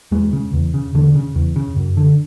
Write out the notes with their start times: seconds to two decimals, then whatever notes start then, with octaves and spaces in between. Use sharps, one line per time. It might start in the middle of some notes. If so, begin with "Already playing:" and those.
0.11 E2 G#3
0.33 C#3
0.53 E2
0.74 C#3
0.94 E2 D3
1.15 C#3
1.35 E2
1.56 C#3
1.76 F#2
1.97 D3